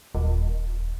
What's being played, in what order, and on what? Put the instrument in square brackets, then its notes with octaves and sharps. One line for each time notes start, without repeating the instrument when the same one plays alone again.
[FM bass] D#1